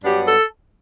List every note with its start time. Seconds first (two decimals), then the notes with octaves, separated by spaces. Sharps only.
0.03 G2 F#3 B3 D4 G4
0.26 A4